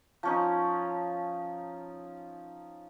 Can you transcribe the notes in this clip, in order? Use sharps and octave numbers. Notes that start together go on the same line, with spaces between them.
F3 C#4 D#4